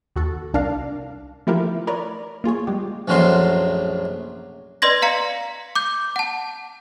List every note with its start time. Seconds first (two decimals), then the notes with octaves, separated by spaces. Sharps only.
0.16 D#2 F#4 A4
0.54 C2 D4 A#4 F5
1.47 F3 A3 E4 F4 G4 A#4
1.87 A#4 B4 C#5 D5 A#5
2.44 A#3 F4 G#4 C#5
2.67 G3 G#3 G4
3.08 A#1 F#2 A2 F3 F#3 C6
4.82 B4 D5 D#5 C6 G#6 A#6
5.02 F5 A#5 C#7
5.75 D6 G6
6.16 F#5 A5